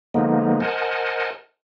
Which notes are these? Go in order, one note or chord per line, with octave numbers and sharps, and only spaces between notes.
D3 F3 G#3 A#3 B3 D#4
A#4 C5 D#5 F#5 G#5 A5